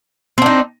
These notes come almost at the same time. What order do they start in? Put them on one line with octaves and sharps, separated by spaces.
C4 D4 D#4